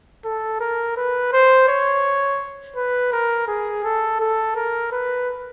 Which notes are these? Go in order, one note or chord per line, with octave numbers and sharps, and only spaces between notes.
A4
A#4
B4
C5
C#5
B4
A#4
G#4
A4
A4
A#4
B4